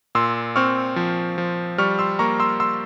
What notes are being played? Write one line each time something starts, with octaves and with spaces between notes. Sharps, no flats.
A#2 C6 E6
C4 C#6 F6
F3
F3
G3 C#6 F6
C6 E6
A#3 A#5 C#6
C6 E6
C6 E6